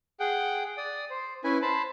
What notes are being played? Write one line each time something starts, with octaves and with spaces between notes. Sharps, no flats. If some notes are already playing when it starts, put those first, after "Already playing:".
G#4 F#5 G5
D5 D#6
C5
C#4 E4 B4 E5 G#5
C5 A5 B5